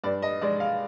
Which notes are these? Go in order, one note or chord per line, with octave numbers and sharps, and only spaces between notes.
G2 D5
D#5
G#3 D5
F5